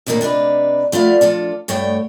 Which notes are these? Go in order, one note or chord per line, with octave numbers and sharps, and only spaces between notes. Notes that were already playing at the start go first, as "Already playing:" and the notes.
D#2 A2 D#3 G#3 A#3 D4
C3 D4 D#4 B4
F3 A3 B3 D5 F5
F3 D4 F4 A4
D2 G2 A3 C#5 G5